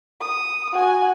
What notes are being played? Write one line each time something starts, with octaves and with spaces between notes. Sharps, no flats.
D#6
F#4 G#5